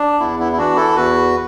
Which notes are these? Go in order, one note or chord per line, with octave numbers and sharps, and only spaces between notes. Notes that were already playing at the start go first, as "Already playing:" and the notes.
Already playing: D4
E2 B3 E4
B3 E4
E4
E3 D4 F#4
E4 A4
E2 F#4 B4